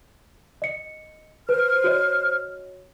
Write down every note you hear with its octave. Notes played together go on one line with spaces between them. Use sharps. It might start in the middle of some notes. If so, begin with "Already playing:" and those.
D#5 C#7
B4 C5 F6
F#4 C#5 D#5